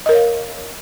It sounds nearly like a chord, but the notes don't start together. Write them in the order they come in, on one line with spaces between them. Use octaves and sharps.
D#5 A#4 C#5 F5